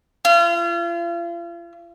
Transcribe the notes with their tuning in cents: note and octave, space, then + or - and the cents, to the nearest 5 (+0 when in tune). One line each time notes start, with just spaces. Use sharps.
F4 -40